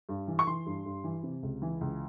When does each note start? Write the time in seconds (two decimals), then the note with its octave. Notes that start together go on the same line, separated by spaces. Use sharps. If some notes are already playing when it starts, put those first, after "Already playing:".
0.09 G2
0.28 E3
0.39 C#6
0.47 E3 C6
0.66 G2
0.86 G2
1.04 E3
1.23 C3
1.43 C#2
1.62 E3
1.81 C#2